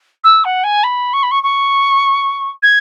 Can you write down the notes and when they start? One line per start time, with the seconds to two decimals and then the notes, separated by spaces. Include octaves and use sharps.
0.24 E6
0.45 F#5
0.64 G#5
0.84 B5
1.13 C#6
1.23 B5
1.31 C#6
1.43 C#6
2.63 G#6